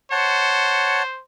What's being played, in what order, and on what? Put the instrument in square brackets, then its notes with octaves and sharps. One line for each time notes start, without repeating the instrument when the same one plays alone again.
[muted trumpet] C5 [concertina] C#5 F#5 A5